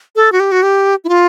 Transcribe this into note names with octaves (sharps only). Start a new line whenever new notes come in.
A4
F#4
G4
F#4
G4
E4
F4